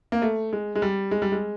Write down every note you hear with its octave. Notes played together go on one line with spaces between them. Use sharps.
A#3
A3
G#3
G#3
G3
G#3
G3
G#3